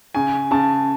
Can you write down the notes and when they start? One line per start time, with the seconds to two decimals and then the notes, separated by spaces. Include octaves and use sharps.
0.15 C#3 G#5
0.51 C#3 A5